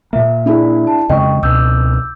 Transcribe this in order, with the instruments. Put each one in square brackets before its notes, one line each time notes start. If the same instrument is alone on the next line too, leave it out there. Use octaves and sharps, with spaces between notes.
[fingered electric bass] A#2 A#3 [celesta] E5
[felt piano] D4 E4 G#4
[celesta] A5
[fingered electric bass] F2 C#3 G#3 [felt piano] D#5 [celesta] G5 C#6
[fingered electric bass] C#2 B2 D4 [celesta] D6 E6 G6